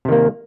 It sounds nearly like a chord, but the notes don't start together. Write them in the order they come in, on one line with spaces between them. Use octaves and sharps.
C3 D#3 A#3